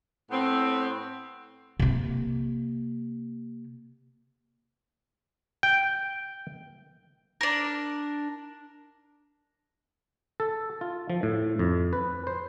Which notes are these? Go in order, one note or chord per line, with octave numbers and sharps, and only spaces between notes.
A2 B3 C4
C3 A#3
G5
D4 A#4
A4
F4
F3
A2
F2
B4
C5